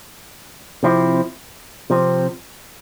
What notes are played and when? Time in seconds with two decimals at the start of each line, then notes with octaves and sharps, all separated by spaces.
0.83 C3 F3 C4 E4
1.90 C3 F3 C4